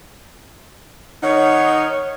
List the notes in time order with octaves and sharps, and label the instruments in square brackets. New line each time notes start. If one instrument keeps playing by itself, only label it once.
[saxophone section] D#3 F#5 [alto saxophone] D#4 [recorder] C#5